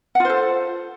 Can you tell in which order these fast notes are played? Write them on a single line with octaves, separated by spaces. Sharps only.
F#5 F4 C5 A4